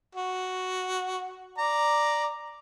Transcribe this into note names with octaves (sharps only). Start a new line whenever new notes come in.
F#4
D5 A#5